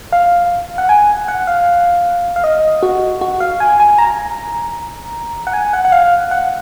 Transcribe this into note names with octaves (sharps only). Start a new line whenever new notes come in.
F5
F#5
G#5
F#5
F5
F5
D#5
F#4
F#4
F5
G#5
G#5
A#5
F#5
G#5
F#5
F#5
F5
F#5